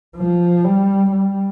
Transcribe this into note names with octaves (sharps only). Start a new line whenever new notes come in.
F3
G3
G3